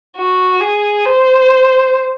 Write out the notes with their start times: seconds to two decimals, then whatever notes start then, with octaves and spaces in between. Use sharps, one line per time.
0.17 F#4
0.61 G#4
1.05 C5